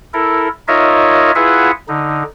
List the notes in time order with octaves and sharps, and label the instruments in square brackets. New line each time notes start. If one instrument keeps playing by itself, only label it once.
[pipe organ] E4 A4 A#4
D#4 F4 A#4 C#5 D#5 E5
E4 F4 G#4 B4 E5 F#5
D3 D#4